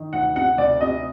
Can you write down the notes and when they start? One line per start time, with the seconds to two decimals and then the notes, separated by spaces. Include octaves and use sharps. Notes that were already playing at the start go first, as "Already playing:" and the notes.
Already playing: D#3
0.13 D2 F#5
0.36 C3 F#5
0.58 D2 D5
0.81 C3 D#5